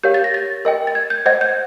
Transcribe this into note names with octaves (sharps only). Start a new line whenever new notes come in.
G4 A#4 C#5 F5 G6
A6
A#6
A6
A#4 D#5 G5
A6
G#6
G6
C5 D#5 F#5 G#6
G6